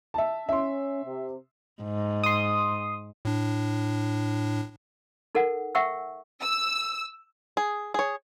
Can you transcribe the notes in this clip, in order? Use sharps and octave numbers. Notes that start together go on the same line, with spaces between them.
E5 A5
C#4 E5 C6
C3
G#2
C6 D#6
A2 D4
D#4 A4 A#4 F#5
E5 F#5 G5 C#6 E6
E6
G#4
G#4 C#5